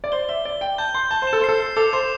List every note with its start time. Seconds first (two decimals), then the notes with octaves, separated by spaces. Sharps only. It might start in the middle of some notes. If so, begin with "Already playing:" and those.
0.04 D5
0.12 C5 G7
0.29 E5 G7
0.45 D5 G7
0.61 G5 G7
0.78 A5 G6
0.95 C6 G6
1.11 A5 G7
1.22 C5
1.27 E7
1.33 A4
1.40 C5
1.44 A4 C7
1.60 C7
1.77 A4 D6
1.93 C5 E7